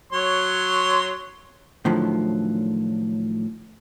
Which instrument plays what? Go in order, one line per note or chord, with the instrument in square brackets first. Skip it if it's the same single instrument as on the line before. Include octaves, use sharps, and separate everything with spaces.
[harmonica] F#3 C#5 C6
[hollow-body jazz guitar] A2 D3 D#3 F3 F#3